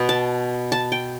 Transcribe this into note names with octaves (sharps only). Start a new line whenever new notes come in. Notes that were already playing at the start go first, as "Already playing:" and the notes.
Already playing: B2 B3
A5
A5
G5